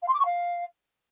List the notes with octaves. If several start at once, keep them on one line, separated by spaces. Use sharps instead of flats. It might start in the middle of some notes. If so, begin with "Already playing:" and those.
F5
C6
D6
C#6
F5